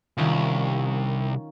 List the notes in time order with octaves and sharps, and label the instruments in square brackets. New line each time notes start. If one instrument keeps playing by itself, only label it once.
[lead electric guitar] C2 [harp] D#3 C#4 F4